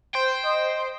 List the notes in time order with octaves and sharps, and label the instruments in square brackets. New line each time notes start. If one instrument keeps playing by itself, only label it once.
[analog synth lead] C5 [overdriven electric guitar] G5
[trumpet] D#5